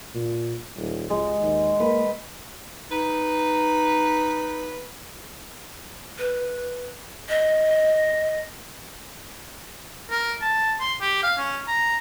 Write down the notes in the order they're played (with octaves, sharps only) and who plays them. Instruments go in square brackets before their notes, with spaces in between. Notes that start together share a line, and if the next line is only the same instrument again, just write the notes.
[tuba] A#2
D#1
[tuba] C#2 [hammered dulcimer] G#3
[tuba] D#2
[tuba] A#3 [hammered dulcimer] B4
[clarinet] D#4 [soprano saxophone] B4
[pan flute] B4
D#5
[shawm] A#4
A5
C6
G4
F5
C#4
A#5